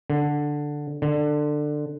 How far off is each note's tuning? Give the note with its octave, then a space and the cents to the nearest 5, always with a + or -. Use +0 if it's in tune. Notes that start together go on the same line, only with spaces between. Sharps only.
D3 +5
D3 +20